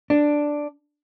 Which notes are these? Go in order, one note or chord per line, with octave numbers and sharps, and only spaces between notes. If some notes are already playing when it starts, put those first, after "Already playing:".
D4